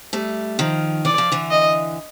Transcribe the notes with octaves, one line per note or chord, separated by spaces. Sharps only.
G3 A3
D#3 F3
E3 D5
F3
D3 E3
D#5